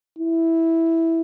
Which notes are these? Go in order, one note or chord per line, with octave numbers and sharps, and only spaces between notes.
E4